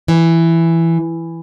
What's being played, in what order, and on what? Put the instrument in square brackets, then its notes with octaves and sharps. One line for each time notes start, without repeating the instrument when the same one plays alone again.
[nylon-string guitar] E3